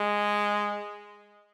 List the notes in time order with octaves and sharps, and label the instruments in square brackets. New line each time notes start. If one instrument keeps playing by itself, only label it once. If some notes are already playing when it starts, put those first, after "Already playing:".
Already playing: [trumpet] G#3